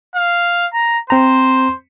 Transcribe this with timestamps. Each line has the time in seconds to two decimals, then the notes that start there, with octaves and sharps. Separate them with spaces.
0.15 F5
0.74 A#5
1.10 C4 C5 A#5